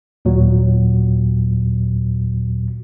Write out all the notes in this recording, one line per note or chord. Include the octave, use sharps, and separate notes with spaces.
D#2 A#2 F#3